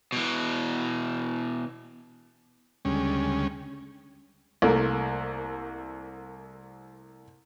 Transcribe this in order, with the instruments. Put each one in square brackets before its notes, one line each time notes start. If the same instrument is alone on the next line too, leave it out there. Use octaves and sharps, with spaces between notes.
[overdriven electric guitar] B2 E3
[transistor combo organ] D2 C#3 G3 G#3 C#4
[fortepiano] C2 A3 A#3